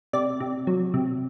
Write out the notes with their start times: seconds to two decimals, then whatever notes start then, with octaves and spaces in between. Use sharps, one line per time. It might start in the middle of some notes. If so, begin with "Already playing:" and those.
0.13 C3 D5
0.40 C3
0.67 F#3
0.94 C3